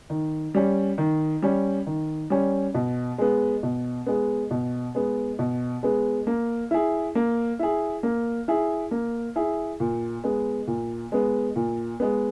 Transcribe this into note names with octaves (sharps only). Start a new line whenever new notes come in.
D#3
G3 C#4
D#3
G3 C#4
D#3
G3 C#4
B2
G#3 B3
B2
G#3 B3
B2
G#3 B3
B2
G#3 B3
A#3
E4 G#4
A#3
E4 G#4
A#3
E4 G#4
A#3
E4 G#4
A#2
G#3 B3
A#2
G#3 B3
A#2
G#3 B3